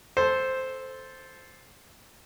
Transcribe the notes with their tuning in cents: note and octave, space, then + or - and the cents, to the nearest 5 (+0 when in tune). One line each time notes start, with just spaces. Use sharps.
A4 -10 C5 +0